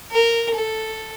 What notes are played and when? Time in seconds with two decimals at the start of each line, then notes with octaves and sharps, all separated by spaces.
0.11 A#4
0.55 A4